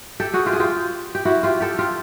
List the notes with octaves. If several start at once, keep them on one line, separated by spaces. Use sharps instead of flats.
G4 A4
F#4 G#4
F4 G4
G#4
F4 G4
G4
E4 F#4
F4 G4
G4 A4
F4 G4